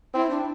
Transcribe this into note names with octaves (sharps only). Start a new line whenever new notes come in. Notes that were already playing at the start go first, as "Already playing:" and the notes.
C4 E4
D4